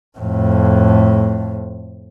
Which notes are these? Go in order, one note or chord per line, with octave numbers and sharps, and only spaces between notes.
F2 A2